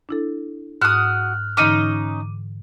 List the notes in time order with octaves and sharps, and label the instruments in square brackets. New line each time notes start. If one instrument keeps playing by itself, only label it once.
[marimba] D4 E4 A4
[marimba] G#2 [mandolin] F#4 D#6 [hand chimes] F6 F#6
[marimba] G#2 D3 E3 [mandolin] C#4 D#4 D#5 [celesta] D6 D#7